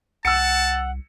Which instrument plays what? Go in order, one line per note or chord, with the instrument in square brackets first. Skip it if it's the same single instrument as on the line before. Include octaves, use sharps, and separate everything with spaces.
[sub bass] C2 [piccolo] F#5 [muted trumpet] A5 [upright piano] E6 C#7